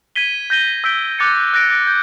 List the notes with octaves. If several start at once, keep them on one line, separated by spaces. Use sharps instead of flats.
G#6 B6 D#7 G7
G6 A#6 D#7 G7
E6 G6 B6 D7 G7
D6 F#6 A6 C#7
D6 F#6 A#6 D7
G6